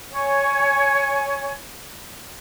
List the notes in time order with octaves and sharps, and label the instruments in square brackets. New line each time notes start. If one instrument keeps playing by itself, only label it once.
[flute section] C#5 G#5